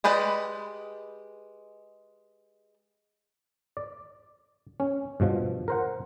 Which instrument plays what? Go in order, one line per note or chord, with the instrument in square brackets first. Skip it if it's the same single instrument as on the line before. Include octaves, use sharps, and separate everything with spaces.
[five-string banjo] G#3 G4 B4 D5 D#5
[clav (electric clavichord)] D5
C#4
G2 B2 F3
A#4 C5 F#5